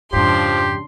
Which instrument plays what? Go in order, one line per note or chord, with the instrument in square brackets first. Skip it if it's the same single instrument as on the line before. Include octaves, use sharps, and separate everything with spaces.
[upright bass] F2 G#2 [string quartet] C#3 D4 C6 [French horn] F3 [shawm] G4